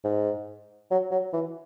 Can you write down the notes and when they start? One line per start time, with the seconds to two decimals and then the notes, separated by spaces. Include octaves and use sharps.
0.04 G#2
0.91 F#3
1.11 F#3
1.33 E3